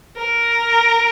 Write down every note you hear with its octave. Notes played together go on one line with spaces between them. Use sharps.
A#4